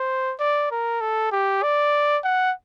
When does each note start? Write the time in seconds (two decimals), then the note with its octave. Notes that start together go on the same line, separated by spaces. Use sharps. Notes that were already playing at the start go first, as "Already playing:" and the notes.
Already playing: C5
0.40 D5
0.71 A#4
1.01 A4
1.32 G4
1.63 D5
2.24 F#5